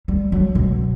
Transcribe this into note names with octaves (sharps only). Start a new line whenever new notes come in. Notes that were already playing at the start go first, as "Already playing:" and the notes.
G3
F#3
B2